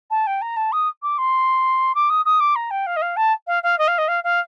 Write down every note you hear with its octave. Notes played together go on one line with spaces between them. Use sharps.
A5
G5
A#5
A5
D#6
D6
C6
D6
D#6
D#6
D6
A#5
G5
F5
D#5
F5
A5
F5
F5
D#5
F5
D#5
F5
F5